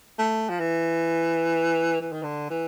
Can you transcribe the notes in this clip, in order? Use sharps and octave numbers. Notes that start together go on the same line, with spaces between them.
A3
F3
E3
E3
D#3
D3
E3